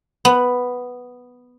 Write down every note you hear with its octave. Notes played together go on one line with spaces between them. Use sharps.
B3